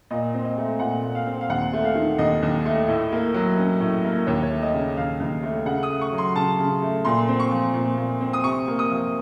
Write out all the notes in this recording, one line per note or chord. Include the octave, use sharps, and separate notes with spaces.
A#2 D#5
C4
D#5
A3
A#2 F#5
A#2
F5
C4
F5
D#2 F#5
A3
F5
D#3
D#2 D#5
D#2
A3
A2
A#3
F#3
C#4
A2
A#3
D#2 C#5
C#5
A3
D#5
C#3
D#2 F5
D#2
A3
C#3 F#5
D#6
A3
C#6
F#3
C6
C#3 A5
C#3
A3
A#2 C6
C4
C#6
F3
A#2
A#2
C4
D#6
C3 C#6
A#3
D#6
F3